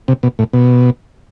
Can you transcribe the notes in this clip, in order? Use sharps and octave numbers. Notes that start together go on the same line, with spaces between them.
C3
B2
A2
B2